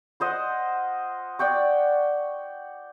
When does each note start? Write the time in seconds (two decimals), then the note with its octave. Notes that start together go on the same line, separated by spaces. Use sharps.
0.20 F4 C5 D#5 F#5
1.39 D5 F#5 G5 C#6